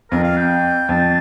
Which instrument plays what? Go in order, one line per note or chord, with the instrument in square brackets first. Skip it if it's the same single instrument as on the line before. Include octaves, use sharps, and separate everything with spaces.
[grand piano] F2 [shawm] A#4
[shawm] F5
G5
[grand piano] F2 [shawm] A5